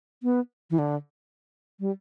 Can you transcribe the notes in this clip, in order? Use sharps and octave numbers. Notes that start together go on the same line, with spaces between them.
B3
E3
D3
G3